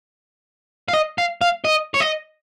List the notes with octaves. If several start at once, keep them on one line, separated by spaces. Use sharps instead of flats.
F5
D#5
F5
F5
D#5
C#5
D#5